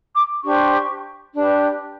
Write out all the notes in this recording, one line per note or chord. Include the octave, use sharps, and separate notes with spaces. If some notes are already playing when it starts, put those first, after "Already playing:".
D6
D4 G4 C5 C#6
D4 G4 B4